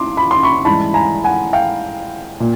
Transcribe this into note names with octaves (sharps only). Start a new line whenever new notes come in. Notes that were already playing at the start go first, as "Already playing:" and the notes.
Already playing: E3 C6 D6
B5
C6
B5 C#6
G#2 E3 G3 A5 B5
G#5 A#5
F#5 G#5
F5 G5
A#2